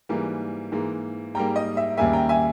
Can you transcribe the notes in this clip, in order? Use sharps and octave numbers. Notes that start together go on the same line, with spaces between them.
G#2 E3 G3 A#3
G#2 E3 A#3
G#2 G3 A#3 G5 A#5
D#5
E5
D#2 C#3 G3 A#3 E5 G#5
G5 A#5
E5 G#5